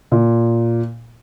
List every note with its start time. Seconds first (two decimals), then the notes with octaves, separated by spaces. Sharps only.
0.12 A#2